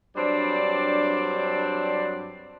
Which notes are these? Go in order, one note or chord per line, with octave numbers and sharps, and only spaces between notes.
G2 F#3 C4 D4 D5